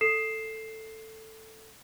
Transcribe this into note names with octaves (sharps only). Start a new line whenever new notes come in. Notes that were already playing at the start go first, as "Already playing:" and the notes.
A4 C7 E7